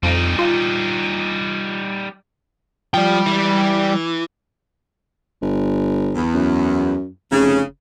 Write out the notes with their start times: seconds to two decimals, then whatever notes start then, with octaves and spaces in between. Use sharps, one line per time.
0.03 F2 G3 D#4
0.39 F4
2.94 F3 G3 G5
3.27 E3
5.42 G1
6.15 E2
6.34 F#2
7.31 F1 C#3